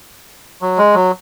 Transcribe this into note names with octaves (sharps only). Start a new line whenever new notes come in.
F#3
G#3
F#3